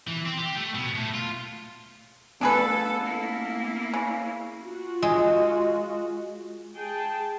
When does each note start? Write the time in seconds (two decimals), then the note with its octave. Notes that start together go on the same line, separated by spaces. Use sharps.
0.07 E3
0.26 C4
0.38 G4
0.57 A3
0.75 B2
0.95 A2
1.14 F4
2.41 A3 B3 D4 G#4 A4 B4
3.03 A#3 E4
3.94 C#3
4.63 F4 F#4
5.02 G#3
6.75 G#4 G5 A5